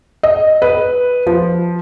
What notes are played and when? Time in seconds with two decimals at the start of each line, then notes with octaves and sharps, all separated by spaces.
0.23 D#5
0.62 B4
1.27 F3